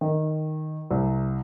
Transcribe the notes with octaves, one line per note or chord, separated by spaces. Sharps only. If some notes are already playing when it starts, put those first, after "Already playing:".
D#3
C2